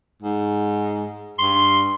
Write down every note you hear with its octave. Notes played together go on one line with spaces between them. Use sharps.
G#2
G2 C6